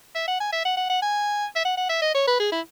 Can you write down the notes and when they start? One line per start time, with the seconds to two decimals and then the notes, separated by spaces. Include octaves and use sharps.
0.15 E5
0.28 F#5
0.40 G#5
0.53 E5
0.65 F#5
0.77 F#5
0.90 F#5
1.02 G#5
1.56 E5
1.65 F#5
1.77 F#5
1.89 E5
2.02 D#5
2.14 C#5
2.28 B4
2.40 G#4
2.52 E4